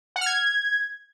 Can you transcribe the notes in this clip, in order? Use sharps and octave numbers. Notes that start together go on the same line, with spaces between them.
F#5
F6
G#6